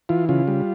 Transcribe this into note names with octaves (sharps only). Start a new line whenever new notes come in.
E3 F4
C#3 F4
G3